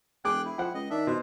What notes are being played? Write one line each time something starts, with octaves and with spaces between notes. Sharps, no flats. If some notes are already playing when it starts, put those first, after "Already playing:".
E1 G#4 G5 D6 F#6
E4
F3 F#5 G5
C#2 D#5
D#3 D4 E5
B2 C5